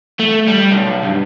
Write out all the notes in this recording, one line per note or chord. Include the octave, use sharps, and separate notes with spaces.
A3
G3
B1
G2